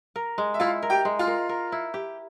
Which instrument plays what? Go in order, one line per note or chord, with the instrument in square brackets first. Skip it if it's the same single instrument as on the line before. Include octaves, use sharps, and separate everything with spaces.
[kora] A#4
G#3
[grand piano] E5
[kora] E4 [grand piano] F4 F5
[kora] A#4
[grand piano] G4 G5
[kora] G#3
[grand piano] F4 F5
[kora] A#4
A#4
E4
G4